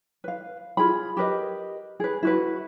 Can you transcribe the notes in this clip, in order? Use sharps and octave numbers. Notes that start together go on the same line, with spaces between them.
B4 F5
F4 G#4 B5
G4 A#4 B4 D#5
G#4 B4
E4 F#4 B4